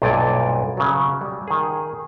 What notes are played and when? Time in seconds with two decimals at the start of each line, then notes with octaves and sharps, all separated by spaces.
0.02 B1 G2 A#2 D5 G#5
0.77 C#3 F#3
1.21 G3
1.48 D#3 G#4